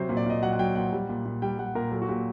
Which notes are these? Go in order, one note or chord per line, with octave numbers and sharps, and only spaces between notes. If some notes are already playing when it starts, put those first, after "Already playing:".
Already playing: C3 F#3 C5
A#2
D5
A#2 D#5
F#3 F#5
F#5
F#3 G5
A#2 F#5
G3
A#2
A#2
G3 G5
G3 F#5
A#2 A#4
F#3 A4
F#4
A#2 G4